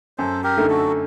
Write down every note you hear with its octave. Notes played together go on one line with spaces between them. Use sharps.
F#2 A4 C5
G4 A#4
D3 A3 D#4
F#4 A4